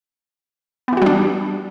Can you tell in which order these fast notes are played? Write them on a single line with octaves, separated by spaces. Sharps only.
B3 E3 F#4 G3 D4